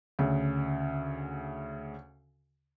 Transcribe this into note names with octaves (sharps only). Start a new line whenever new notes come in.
D2 C#3